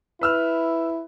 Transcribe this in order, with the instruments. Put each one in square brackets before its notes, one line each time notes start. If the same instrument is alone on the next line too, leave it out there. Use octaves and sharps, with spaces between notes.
[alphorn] E4 [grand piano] B4 E6 F6